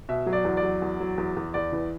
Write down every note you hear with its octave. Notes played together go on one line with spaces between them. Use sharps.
B2 E5
F#3
D5
E2
D5
F#3
E2
F#3
E2
E2
E2 D5
E3